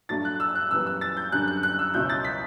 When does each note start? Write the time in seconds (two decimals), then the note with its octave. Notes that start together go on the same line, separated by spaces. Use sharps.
0.09 G2 F#3 A3 D4 A6
0.25 F#6
0.40 E6
0.55 F#6
0.71 F#2 E3 G3 B3 E6
0.86 E6
1.01 A6
1.17 G6
1.32 F#2 D3 G3 F#6
1.47 F#6
1.63 F#6
1.79 E6
1.94 C#2 B2 F#3 C#4 E4 G6
2.10 A6
2.24 B6